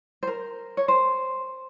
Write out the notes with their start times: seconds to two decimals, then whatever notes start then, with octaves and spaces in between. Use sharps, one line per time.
0.23 C5
0.27 A#4
0.77 C#5
0.88 C5